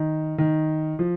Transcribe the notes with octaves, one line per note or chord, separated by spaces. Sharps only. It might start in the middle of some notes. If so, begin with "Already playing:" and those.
Already playing: D#3
D#3
F3